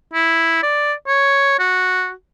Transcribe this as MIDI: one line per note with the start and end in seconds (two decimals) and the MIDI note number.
0.14 0.61 64
0.63 0.93 74
1.07 1.55 73
1.59 2.11 66